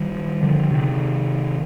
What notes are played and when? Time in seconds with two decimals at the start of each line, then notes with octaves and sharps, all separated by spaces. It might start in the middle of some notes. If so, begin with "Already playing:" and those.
Already playing: D#3 G3
0.43 D3 F3
0.71 C3 D#3